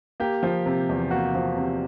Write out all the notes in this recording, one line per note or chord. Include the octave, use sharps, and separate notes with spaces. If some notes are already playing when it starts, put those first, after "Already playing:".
A#3 G4
F3
C3
E2
A#3 F#4
F3
C3